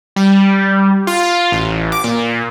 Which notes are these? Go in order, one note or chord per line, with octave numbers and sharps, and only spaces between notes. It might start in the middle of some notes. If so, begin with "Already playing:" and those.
G3
F4
A1
D6
A#2